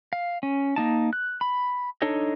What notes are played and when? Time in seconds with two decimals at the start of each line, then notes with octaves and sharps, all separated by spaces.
0.13 F5
0.43 C#4
0.76 A#3 D#4 A5
1.13 F#6
1.41 B5
2.02 D4 D#4 A4 C#5 D#5